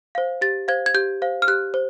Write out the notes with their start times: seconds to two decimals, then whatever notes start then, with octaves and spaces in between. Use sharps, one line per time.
0.15 C5 F5
0.41 G4 A6
0.68 C5 F5 G#6
0.86 G#6
0.95 G4 G6
1.22 C5 F5
1.42 F6
1.48 G4 F#6
1.74 C5